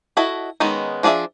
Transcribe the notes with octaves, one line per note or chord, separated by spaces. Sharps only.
E4 F#4 A4 D#5
D#3 G#3 B3 C#4 D#4
F3 D4 G#4 D5 E5